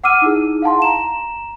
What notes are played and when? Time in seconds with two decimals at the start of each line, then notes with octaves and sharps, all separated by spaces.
0.04 F#5 D6 E6 F6 D#7
0.22 D#4 E4 G#4
0.62 F5 F#5 A5 C6
0.82 A#5 E7